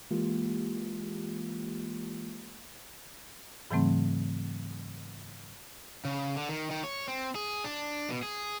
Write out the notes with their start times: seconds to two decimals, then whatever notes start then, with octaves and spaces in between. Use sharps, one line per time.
0.11 E3 G#3 A#3 F4 G4
3.71 G#2 C#3 E3 F#3 A3 C4
6.05 C#3
6.37 D3
6.49 D#3
6.71 D#3
6.84 C#5
7.08 C4
7.35 G#4
7.64 D4
8.10 B2
8.23 G#4